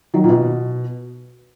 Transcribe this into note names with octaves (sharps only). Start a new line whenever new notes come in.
D#3 F#3
A#2
B2